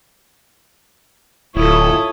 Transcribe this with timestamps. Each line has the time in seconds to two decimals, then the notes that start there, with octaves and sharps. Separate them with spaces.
1.55 D1 E4 F4 A4 C#5 D#6